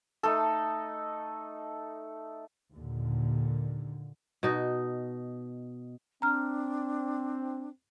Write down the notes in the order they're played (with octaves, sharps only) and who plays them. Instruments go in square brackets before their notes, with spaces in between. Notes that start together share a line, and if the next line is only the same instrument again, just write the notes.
[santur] A3 D#4 A4
[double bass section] D#2 A#2 D3
[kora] B2 D#4
[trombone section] C4 [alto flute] D4 [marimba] A#5 F6